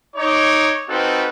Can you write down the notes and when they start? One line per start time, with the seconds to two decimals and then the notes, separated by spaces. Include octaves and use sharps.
0.16 D#4 C#5 D6
0.88 C4 D#4 F4 F#4 A4 B4